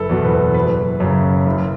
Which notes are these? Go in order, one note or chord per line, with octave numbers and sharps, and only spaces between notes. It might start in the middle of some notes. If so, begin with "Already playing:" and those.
Already playing: F#1 A4 B4
E2 B2
B4
F#1 B4
F#2 C#3
F#1